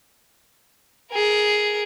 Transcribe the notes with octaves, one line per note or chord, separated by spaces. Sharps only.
G#4 A#4